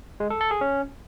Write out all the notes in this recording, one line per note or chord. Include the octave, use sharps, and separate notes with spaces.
G#3
A4
A4
G#4
C#4